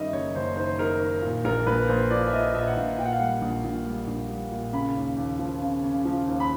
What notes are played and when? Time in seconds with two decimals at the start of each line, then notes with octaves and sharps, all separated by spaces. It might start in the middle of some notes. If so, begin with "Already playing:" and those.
Already playing: F#2 D#3 G3 D#5 E5
0.12 F#1 C#5
0.35 F#1 C5
0.56 D#3 C5
0.78 D#3 A#4
1.00 D#3
1.22 A#2
1.44 A#1 A#4
1.67 A#1 B4
1.88 A#1 C5
2.10 F3 D5
2.27 E5
2.33 F3 D#5
2.54 A#2 E5
2.67 F#5
2.76 A#1 F5
2.98 A#2 G5
3.05 F#5
3.12 F5
3.19 G3 F#5
3.41 A#1
3.64 A#1
3.86 G3
4.07 A#1
4.29 G3
4.51 A#2
4.73 C#3 B5
4.95 D#2
5.17 D#2
5.39 F3
5.61 C#3
5.83 C#3
6.05 F3
6.27 D#2
6.40 B5